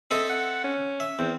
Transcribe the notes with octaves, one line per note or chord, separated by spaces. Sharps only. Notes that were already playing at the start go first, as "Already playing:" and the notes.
C4 A4 D#5 E5
F#5
C#4
E5
E2 C4